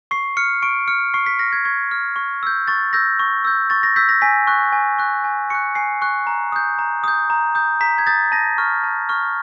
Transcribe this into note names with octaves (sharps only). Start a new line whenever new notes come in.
C#6 C7
F6 C#7
C#6 D7
F6 C#7
C#6 C7
B6
F6 A#6
G#6
C#6 G#6
F6
C#6
E6 G6
C#6 A6
E6 G6 A#6
C#6
E6 G6
C#6 A6
A#6
E6 G6 B6
A#6
G#5 B6
C#6 F#6
G#5
C#6 F#6
G#5
C#6 F#6 C#7
G#5 C7
C#6 F#6
A#5
D#6 G6
A#5
D#6 G6
A#5
D#6 G6
A#5 B6
G#6
D#6 G6 A6
A5 A#6
C#6 F6
A5
C#6 F6